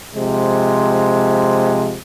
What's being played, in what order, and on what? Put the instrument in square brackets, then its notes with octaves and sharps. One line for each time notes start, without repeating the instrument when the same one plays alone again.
[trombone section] C3 F3 G#3